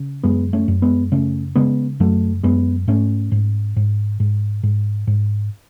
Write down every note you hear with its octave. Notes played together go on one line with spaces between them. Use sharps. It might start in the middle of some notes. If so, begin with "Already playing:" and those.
Already playing: C#3
F#2 G#3 B3
A3 C#4
F#2
G#3 B3
C#3 A3 C#4
C#3 G#3 B3
F#2 F#3 A3
F#2 G#3 B3
G#2 A3 C#4
G#2
G#2
G#2
G#2
G#2